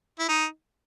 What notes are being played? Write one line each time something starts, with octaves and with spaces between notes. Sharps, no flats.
E4
D#4